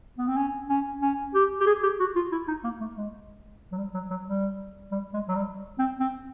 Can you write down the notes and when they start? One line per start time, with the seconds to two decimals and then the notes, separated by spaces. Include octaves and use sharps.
0.18 B3
0.28 C4
0.37 C#4
0.70 C#4
1.02 C#4
1.34 G4
1.60 G4
1.67 G#4
1.83 G4
2.00 F#4
2.16 F4
2.32 E4
2.48 D#4
2.64 A#3
2.81 A3
2.98 G#3
3.72 F#3
3.78 G3
3.94 F#3
4.10 F#3
4.27 G3
4.92 G3
5.14 G#3
5.28 F#3
5.35 G3
5.79 C4
6.00 C4